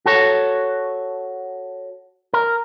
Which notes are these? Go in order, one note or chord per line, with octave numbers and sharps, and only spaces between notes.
F#4 A4 C#5
A#4